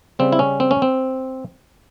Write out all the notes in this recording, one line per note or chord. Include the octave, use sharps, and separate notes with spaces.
C#3 G3 C4
E4
C#4
C4
C#4
C4